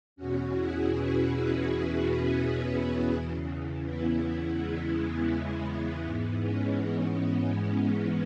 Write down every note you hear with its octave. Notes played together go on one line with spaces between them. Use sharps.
E2 B2 C#4 F#4
E4 G#4
F#4 B4
F#4 B4
E4 G#4
B3 E4
C#4 F#4
E4 G#4
E2 C#3 E3
B3 E4
B3
G#3
B3
G#2 E3 B3
G#3 C#4
G#3 C#4
G#3